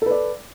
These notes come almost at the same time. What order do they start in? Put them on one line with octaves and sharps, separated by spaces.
A4 B4 D5